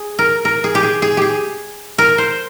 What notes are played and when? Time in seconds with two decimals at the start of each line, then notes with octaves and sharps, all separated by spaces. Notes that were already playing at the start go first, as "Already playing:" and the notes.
Already playing: G#4
0.19 A#4
0.45 A#4
0.64 G#4
0.75 G4
0.83 G#4
1.02 G#4
1.17 G4 G#4
1.98 A#4
2.18 C5